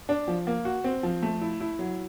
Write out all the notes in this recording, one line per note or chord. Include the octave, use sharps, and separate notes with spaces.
D4
F3
A#3
F#4
C4
F3
A3
E4
E4
F#3